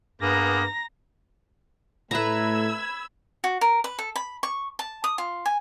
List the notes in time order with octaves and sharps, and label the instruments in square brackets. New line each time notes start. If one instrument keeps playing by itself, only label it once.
[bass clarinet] G2 [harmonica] A#3 B3 G#4 [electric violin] A#5 A#6
[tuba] A2 [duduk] A3 [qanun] B4 A#5 [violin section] B5 E6 G#6
[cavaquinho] F#4
A#4
B4
A4
B5
C#6
A5
D#6
F4
G#5